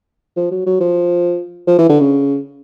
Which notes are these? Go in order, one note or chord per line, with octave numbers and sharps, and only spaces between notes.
F3
F#3
F#3
F3
F3
E3
D3
C#3